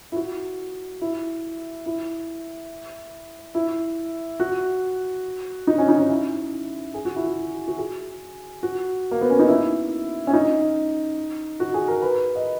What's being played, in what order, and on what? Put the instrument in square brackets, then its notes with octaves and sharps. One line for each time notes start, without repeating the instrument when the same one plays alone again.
[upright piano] E4
F#4
E4
E4
E4
F#4
D#4
C#4
D#4
C#4
E4
G#4
F#4
E4
F#4
F#4
G#4
F#4
A#3
B3
C#4
D#4
E4
C#4
D#4
F#4
G#4
A#4
B4
D#5